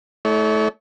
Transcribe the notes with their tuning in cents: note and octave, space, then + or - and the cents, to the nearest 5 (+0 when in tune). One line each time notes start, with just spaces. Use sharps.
A3 -20 E4 -40 C#5 +25